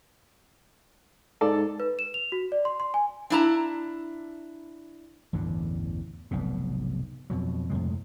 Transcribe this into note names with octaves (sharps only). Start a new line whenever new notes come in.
G#2 A4 D5
B4
E7
F7
F#4
D5
C6
C6
G#5
D4 E4 A#5
A1 E2 G2 D3
F1 B1 G#2 B2
F2 B2 F#3
F2 A2 C3 G#3